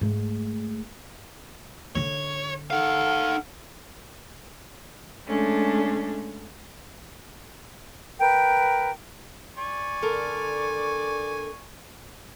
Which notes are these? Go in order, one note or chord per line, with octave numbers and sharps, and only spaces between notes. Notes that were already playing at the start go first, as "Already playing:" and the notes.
G#2 A3
D3 D4 C#5
D#4 A4 F5 F#5 F6
G#3 A3 C#4 D4
A#4 B4 G5
D5 G#5 C#6
D3 A4 A#4